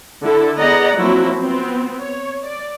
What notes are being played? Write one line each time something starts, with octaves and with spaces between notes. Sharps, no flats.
D3 E4 A4
B3 G#4 D5 D#5 F#5 A#5
F3 F#3 A#3 C4 E4 F#4
B3 C4
C#5
D5